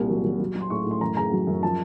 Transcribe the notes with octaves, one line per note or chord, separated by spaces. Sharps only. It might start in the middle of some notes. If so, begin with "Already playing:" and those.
Already playing: C2 A#2
F#3
F#3
F#3
F#3
C6
A2 C#6
A2
C6
F#2 A#5
C#3 A#5
F#3
F#2
F3 A5